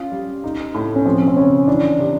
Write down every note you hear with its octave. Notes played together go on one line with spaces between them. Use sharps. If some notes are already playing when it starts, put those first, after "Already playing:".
Already playing: C#4 F4
G3
D#4
A2
C#4
F3 C4
C4
C#3 C#4
E3 D4
C3